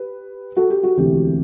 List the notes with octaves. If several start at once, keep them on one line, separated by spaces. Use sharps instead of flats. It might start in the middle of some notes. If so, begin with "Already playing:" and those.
Already playing: G4 B4
F#4 A4
G4
F#4
E1 D2 C3 E3 A3 G4